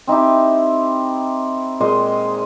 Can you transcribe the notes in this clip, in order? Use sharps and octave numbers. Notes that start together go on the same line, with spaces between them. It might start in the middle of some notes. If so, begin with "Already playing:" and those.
C4 D#4 E4 G4
A#2 G#3 C5 D#5